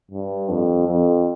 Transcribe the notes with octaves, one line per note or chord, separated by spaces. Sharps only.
G2
F2
F2